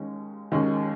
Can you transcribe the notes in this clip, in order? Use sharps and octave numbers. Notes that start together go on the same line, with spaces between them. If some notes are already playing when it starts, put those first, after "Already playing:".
Already playing: D#2 D#3 G#3 C#4
D#2 D#3 G#3 C#4